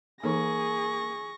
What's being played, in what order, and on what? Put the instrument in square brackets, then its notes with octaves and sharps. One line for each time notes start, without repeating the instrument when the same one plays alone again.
[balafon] E3 D#4 A4 [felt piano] A#3 [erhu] G#4 [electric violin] C#6 A#6